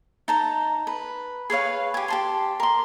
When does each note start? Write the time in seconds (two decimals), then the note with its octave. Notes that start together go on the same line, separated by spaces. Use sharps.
0.28 D#4 A5 A#5
0.87 B4
1.50 G#4 B4 C#5 F5
1.94 G4 G#5
2.08 G4 A5 C6
2.60 A#4 C6